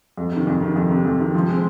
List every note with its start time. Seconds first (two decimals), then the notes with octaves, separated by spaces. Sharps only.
0.17 F2
0.32 C3 D#3
0.47 F2
0.61 C3 D#3
0.76 F2
0.90 C3 D#3
1.05 F2
1.20 C3 D#3
1.35 F3
1.49 G#3 C4